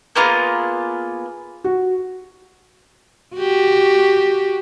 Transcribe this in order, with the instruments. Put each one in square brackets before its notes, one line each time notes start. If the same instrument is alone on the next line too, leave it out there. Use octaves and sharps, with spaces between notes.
[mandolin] A#3 B3 F4 G#4
[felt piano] F#4
[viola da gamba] F#4 G4